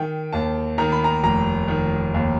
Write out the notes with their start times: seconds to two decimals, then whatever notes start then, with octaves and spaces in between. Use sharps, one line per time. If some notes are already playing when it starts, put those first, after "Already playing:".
Already playing: D#3 G5
0.33 D#2 A5
0.78 D#3 A#5
0.92 B5
1.04 A#5
1.23 F1 A#5
1.68 D#3
2.14 D#2